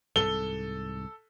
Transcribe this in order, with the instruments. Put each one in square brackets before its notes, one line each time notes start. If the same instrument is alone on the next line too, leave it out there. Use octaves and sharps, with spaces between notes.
[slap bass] C2 G#2 [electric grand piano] A4 [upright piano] G7